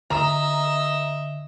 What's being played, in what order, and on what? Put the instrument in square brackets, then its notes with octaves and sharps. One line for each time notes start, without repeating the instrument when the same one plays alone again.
[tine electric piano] D3 [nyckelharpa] D#5 E5 [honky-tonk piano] A#5